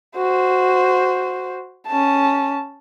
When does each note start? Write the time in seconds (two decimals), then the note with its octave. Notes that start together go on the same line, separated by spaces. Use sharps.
0.17 F#4 C5
1.87 C#4 A5